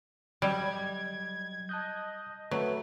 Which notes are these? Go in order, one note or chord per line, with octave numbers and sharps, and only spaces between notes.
F#3 G3 D#5 G#6
D#5 A5 F#6 G6
F#3 A3 B4